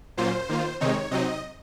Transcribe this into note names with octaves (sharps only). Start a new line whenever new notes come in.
A#2 F#3 A#3 C#4 F4 C5
D#3 A#3 F4
C3 D#3 G#3 C4 D#4 C#5
C3 F#3 C4 D#4 D#5